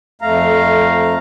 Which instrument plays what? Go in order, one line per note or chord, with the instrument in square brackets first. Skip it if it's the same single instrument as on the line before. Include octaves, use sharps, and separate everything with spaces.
[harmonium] F2 A3 F5 A#5